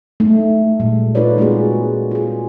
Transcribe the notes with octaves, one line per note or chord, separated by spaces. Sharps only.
A3 D#4
A#2 G3 G#3
D#4 F4 A4 B4 C#5 D5
G#3 A#3 C4 F4 F#4 G#4
F4 G#4